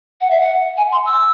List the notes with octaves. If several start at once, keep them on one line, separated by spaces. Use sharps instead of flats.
F#5
E5
F#5
G#5
C6
E6